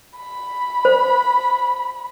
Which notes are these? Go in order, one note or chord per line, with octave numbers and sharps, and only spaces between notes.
B5
C5